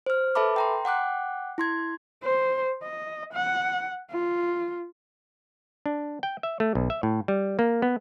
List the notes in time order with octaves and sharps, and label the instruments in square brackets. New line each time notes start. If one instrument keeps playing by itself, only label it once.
[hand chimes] C5 F6
A4 B4 E5 A5 B5 D6
G5 A#5 C6
F#5 G5 D6 F#6
E4 C6 G#6
[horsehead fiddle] C5
D#5
F#5
F4
[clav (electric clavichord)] D4
G5
E5
A3
B1
E5
A2
G3
A#3
B3